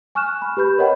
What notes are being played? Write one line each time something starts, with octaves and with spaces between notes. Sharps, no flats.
G#5 C#6 F6 F#6 E7
B5
G4 B4 B5 G6
A#4 C#5 D#5 F#5 G5 B5